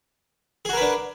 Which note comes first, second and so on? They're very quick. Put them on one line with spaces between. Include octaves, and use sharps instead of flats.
G#4 F#4 A#4 B4 D4